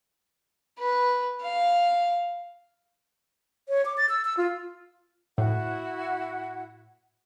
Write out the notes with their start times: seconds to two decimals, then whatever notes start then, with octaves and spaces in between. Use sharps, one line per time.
0.79 B4
1.42 F5
3.69 C#5
3.86 D6
3.97 A6
4.09 E6
4.25 E6
4.37 F4
5.38 A2 E4 F#4 F#5